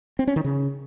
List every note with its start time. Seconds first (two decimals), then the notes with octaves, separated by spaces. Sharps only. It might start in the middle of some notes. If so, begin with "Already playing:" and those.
0.19 C4
0.27 C#4
0.36 D#3
0.45 C#3